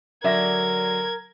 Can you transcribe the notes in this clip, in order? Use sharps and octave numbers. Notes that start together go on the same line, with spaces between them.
D3 F#3 A#4 D5 E5 G#6 A#6